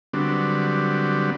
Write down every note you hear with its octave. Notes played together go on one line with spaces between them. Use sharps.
D3 F#3 G3 B3 C4 D4